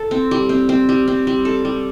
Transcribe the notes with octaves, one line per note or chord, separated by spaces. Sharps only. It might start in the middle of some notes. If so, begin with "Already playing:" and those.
Already playing: A4
C4
G3
C4
C4
G3
C4
G3
A4
G3